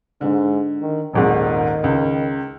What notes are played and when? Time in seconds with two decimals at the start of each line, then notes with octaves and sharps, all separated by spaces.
0.21 G#2 D3
0.82 D#3
1.13 D#1 G#1 G#2 D#3
1.84 C#2